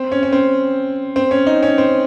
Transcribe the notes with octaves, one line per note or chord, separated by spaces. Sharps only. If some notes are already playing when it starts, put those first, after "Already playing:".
Already playing: C4
C#4
C#4
C4
C4
C#4
D#4
C#4
C4